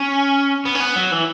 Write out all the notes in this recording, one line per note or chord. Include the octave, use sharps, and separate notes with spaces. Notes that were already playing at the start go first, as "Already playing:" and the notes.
Already playing: C#4
B3
C#4
B3
F#3
E3